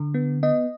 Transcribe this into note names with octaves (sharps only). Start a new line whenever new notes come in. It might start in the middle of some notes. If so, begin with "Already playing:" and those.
Already playing: D3
B3
B3 D#5